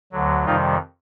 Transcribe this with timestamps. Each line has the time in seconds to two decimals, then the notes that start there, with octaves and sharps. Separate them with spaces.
0.12 D2 D3 F#3
0.45 F2 C3 D#3 G3 D#4 F4